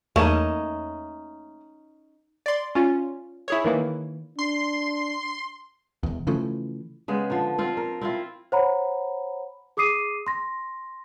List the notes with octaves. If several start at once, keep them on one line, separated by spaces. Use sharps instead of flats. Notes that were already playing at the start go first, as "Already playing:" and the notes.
E2 A3 A#3 C#4 D#4 E7
D5 C6
C#4 F4
E4 G#4 C#5
D#3 E3 A#3 E4
D4 C6
E1 E2
C#3 E3 F3 A3
C#3 G#3 B3
D3 F3
C4 F4
A#4
C4 E4 F4
C5 C#5 F#5 A#5 B5
G#4 D6 D#6 C7 D#7
C6 A#6